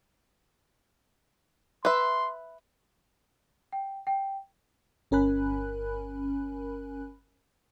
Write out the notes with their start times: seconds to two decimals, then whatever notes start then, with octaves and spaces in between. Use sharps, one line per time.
1.85 B4 E5 C6
3.72 G5
4.07 G5
5.11 G1 C#4 A#4 G#5 B5 F#6